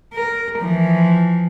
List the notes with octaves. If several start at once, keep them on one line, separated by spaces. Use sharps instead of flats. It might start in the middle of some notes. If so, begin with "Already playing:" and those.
A#4
E3 F3